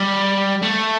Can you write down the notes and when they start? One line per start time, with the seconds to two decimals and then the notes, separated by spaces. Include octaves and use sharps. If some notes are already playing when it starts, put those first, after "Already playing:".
Already playing: G3
0.62 A3